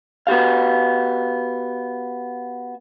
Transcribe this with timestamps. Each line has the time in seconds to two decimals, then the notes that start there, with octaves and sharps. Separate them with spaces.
0.27 B3 F#4 G4 F5